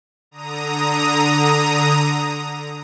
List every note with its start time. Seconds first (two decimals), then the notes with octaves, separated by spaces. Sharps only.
0.31 D3 A#5 D#6